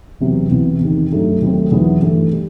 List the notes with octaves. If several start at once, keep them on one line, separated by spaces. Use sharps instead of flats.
E2 C3 F#3 B3
C2 C3 E3 B3
E2 C3 D#3
G2 F#3 A3 D#4
D#2 D#3 F#3 A3 C4
E2 D#3 F#3 B3 E4
G2 E3 A3 E4
G3